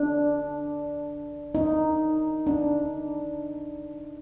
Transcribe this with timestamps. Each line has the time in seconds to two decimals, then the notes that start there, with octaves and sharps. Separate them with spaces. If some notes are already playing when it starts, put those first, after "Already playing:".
Already playing: D4
1.55 D#4
2.47 D4